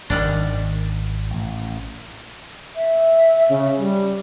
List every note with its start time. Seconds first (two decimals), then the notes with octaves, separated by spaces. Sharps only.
0.10 D#1 G#1 D#3 G3 D4
1.30 A1
2.76 E5
3.49 C#3
3.78 G3